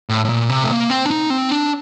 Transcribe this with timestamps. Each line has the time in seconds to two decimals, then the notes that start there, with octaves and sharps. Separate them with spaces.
0.09 A2
0.25 A2
0.29 A#2
0.49 C3
0.64 A3
0.70 A#3
0.90 C4
1.05 D4
1.11 D#4
1.30 C4
1.51 D4